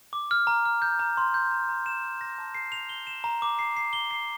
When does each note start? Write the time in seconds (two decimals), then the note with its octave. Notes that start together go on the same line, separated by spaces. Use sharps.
0.13 D6
0.31 F6
0.47 A#5
0.65 F6
0.82 G6
0.99 A#5
1.17 C6
1.34 G6
1.51 A#5
1.69 A#5
1.86 E7
2.04 E7
2.21 A#6
2.38 A5
2.55 C7
2.72 F7
2.89 G7
3.07 E7
3.24 A#5
3.42 D6
3.59 C7
3.77 C7
3.93 G7
4.11 C7